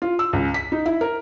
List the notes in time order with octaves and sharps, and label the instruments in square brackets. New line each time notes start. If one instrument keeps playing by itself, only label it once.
[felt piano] F4
E6
C#2
B6
D#4
E4
A#4